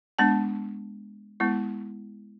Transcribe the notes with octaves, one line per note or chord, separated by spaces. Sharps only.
G#3 B3 D4 A5
G#3 B3 E4